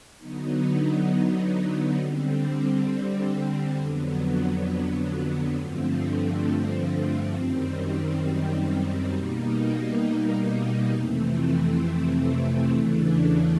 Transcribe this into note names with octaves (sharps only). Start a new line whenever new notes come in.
D3 F#3 B3 D#4
D3 G3 C4
F2 D3 F#3 B3
G2 D3 F3 A3 C4
F#2 D#3 G3 C4
B2 G3 A#3 D#4
F2 C3 E3 A3 C4
E2 C#3 E3 A3 D4